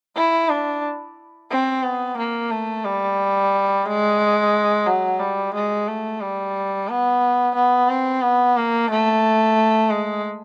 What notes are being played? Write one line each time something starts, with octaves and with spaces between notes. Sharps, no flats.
E4
D4
C4
B3
A#3
A3
G3
G#3
F#3
G3
G#3
A3
G3
B3
B3
C4
B3
A#3
A3
G#3